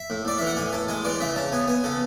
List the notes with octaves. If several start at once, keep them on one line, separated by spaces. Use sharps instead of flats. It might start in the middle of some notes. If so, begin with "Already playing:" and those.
Already playing: E5
A2
A2 D5
E3 E5
F#5
A2 G#5
A2 A5
G#3 G#5
E3 D5
C#3 E5
C#3 A5
B3 G#5
B3 G#5
C#3 A4